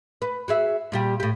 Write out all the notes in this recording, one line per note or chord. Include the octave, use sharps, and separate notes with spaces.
B4
F#4 G#4 E5
A#2 G3 G4
A2 G4